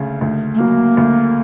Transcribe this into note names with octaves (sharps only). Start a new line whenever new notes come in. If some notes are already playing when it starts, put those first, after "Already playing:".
Already playing: D2 C#3
D2
A3
F#3 A#3
D2